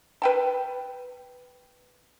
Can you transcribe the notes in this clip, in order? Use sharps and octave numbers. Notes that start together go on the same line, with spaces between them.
B4 G5 A5